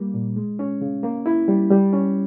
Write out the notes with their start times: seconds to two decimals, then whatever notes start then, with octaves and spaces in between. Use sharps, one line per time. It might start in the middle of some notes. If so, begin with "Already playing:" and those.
Already playing: G3 A#3
0.14 A#2
0.36 G#3
0.59 C#4
0.81 C#3
1.03 A#3
1.26 E4
1.48 G3
1.70 G3
1.93 C#4